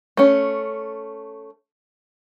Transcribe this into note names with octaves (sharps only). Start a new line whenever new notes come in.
A3 C#4